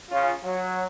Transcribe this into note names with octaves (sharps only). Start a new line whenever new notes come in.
C#3 C#4 F4
F#3